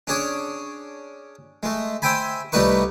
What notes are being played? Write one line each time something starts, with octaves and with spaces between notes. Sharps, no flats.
C#4 D4 G#4 C#5
G#3 A3
C5 E5 G5 G#5 B5
C2 G3 A3 D#4 B4 C#6